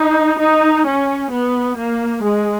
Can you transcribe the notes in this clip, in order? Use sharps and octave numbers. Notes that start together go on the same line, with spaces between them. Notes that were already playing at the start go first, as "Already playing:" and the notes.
Already playing: D#4
D#4
C#4
B3
A#3
G#3